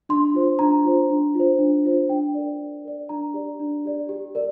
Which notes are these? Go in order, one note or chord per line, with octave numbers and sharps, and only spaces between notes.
D4 C6
F4 C5
D4 A#5
F4 C5
D4
F4 C5
D4
F4 C5
D4 G5
A#4 D5
D4
A#4 D5
D4 A#5
G4 D5
D4
G4 D5
G4
A#4 D5